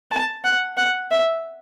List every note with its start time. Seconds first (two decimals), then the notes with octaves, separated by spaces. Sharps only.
0.11 A5
0.44 F#5
0.77 F#5
1.11 E5